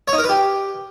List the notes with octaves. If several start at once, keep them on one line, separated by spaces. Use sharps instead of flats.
C#5
D#4
A#4
B4
G4